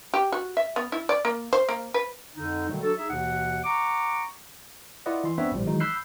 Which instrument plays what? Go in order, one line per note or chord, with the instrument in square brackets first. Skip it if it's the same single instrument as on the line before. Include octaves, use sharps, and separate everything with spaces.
[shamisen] G4
F#4
E5
B3
E4
D5
A#3
C5
A#3
B4
[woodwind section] F2 D3 D#4
B2 D3 D#3 F#3 G3 A3
F#3 D4 F#4 A4
D#4 G#4 E5
D#2 B2 E3 F#5
F#5 A#5 C#6 D6
[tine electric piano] E4 F4 B4 D5 D#5 F#5
E3 C6
B3 C4 D4 B4 C#5 E5
A#1 A2 F3 G3
D#3 E3 F#3 G#3 D#4
B5 E6 F#6 G6 C7